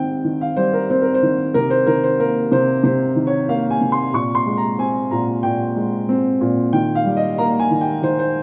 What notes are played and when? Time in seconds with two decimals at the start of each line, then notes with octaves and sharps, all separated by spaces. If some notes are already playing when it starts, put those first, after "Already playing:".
Already playing: D#3 C4 G5
0.24 D#3
0.41 F5
0.57 G3 C5
0.73 A#4
0.90 C4 C5
1.02 A#4
1.14 C5
1.23 D#3
1.54 C3 A#4
1.70 C5
1.87 D#3 A#4
2.04 C5
2.19 A#3 A#4
2.52 C3 C5
2.83 C3 C5
3.16 D#3
3.27 C#5
3.49 A#3 F5
3.70 G#5
3.81 C3
3.92 C6
4.13 A#2 C#6
4.35 C6
4.46 G#3
4.57 A#5
4.78 C4 G#5
5.11 A#2 A#5
5.43 A#2 G5
5.76 G#3
6.09 C4
6.41 A#2
6.73 D#3 G5
6.95 F5
7.05 G3
7.17 D#5
7.38 A#3 A#5
7.59 G#5
7.71 D#3
7.81 G5
8.03 D#3 C5
8.19 C5